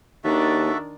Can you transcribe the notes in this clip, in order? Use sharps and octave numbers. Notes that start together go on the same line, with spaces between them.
D#2 D#3 D4 F#4 A4 E5